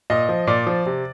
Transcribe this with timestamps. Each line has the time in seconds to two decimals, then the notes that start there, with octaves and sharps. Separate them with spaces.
0.10 A#2 D#5
0.29 F3
0.47 A#2 D5
0.67 F3
0.86 C3